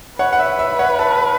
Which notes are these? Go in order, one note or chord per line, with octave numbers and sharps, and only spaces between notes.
B4 C#5 F#5
F#5
E5
E5
C#5 F#5
E5 A5